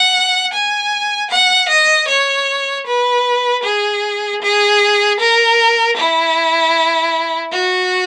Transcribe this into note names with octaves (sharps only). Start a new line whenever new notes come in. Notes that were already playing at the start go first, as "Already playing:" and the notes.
Already playing: F#5
G#5
F#5
D#5
C#5
B4
G#4
G#4
A#4
E4
F#4